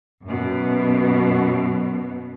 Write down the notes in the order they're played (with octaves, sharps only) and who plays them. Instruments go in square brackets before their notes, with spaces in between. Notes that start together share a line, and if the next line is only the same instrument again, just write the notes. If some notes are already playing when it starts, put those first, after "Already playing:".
[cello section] F#2 B2